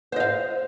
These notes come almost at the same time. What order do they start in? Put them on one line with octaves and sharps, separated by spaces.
C5 D#5 F5